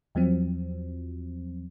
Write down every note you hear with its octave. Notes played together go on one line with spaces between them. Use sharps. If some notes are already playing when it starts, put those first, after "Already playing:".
E2 F3 F#3 C4